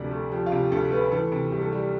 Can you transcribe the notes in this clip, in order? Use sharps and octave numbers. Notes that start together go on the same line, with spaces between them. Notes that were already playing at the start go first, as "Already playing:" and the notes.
Already playing: D2 C3 F3 D5
A3
F3 G4
F4
C3 G4
D2 A4
A3 B4
E3 A4
C3
C2 G4
A4
G3 G4